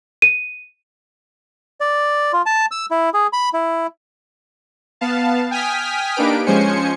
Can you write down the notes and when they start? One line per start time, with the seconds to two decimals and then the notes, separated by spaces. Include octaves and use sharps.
0.22 D#7
1.81 D5
2.33 F4
2.46 A5
2.71 E6
2.91 E4
3.14 G#4
3.33 B5
3.54 E4
5.01 B3 F5 A5
5.51 G5 G#5 D#6 F6 B6
6.16 A#3 D4 D#4 G4 B4 D7
6.46 F3 G#3 C#4 C5 G#5 C#7